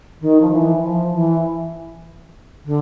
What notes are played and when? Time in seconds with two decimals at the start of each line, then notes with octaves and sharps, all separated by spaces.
0.21 D#3
0.41 F3
0.52 E3
0.82 F3
1.13 E3
2.65 D3